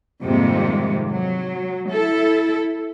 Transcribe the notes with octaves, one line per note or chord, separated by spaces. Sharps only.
F2 G#2 C3 D#3 G3 A#3
F#3
E4 A4